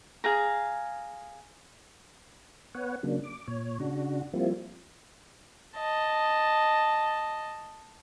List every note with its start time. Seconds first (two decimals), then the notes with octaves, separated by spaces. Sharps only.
0.24 G#4 F5 A#5
2.75 B3 B4 C#5 F#5
3.03 C#3 F#3 A#3 D4
3.23 D6
3.48 A#2 C#5
3.80 C#3 D4 F#4
4.34 F3 G3 A#3 C4 E4 F4
5.75 D#5 A5